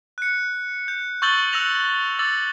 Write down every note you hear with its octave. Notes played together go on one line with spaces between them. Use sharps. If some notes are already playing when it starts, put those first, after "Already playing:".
F#6 C#7
G6
C#6 E6 G6 A6 F#7 G7
E6 F#6 A#6 F7 F#7
D6 E6 A6 F#7